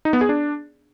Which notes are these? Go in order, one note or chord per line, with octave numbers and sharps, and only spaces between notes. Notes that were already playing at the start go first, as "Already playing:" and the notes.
D#4
B3
G#4
D4